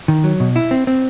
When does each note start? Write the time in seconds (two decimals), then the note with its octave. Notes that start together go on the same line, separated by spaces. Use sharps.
0.08 D#3
0.24 F#3
0.40 B2
0.56 E4
0.71 C4
0.87 C4